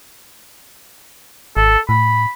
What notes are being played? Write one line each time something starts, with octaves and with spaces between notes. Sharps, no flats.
G#1 A4
A2 B5